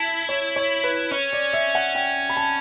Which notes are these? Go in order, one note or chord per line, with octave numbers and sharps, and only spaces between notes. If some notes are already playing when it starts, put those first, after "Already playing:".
Already playing: E4 A5
C#5
C#5
B4
C#4 C#5
D5
E5
F#5
G5
B5
A5